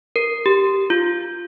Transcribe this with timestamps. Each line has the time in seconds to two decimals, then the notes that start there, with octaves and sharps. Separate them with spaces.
0.16 A#4
0.46 G4
0.90 F4